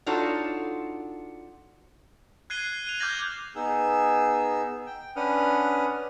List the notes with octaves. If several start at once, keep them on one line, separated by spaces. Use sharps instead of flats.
D4 D#4 F4 F#4 A4 C#5
F#6 G#6 C7 D#7 G7
D#7 F7
D6 F6 G6 G#6 A#6 F#7
B3 D#4 G#4 E6
G5
C#4 D4 B4 F#5 D#6 F6